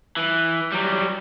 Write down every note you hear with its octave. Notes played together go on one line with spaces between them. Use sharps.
E3
F#3 G3